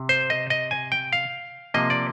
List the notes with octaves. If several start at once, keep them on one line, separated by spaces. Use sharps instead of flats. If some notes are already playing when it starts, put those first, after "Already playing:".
Already playing: C3
C5
D#5
D#5
G#5
G5
F5
C3 F3 A#3 D#5
D5